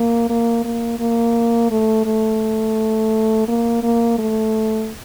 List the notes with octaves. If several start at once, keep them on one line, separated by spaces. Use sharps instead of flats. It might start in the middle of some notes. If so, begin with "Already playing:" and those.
Already playing: A#3
A#3
A#3
A#3
A3
A3
A#3
A#3
A3